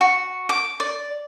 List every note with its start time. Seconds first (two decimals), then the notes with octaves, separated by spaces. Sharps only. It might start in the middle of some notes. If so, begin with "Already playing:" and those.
0.01 F#4
0.49 D6
0.80 D5